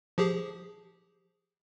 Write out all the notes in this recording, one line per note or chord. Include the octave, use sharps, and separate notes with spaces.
F3 G4 G#4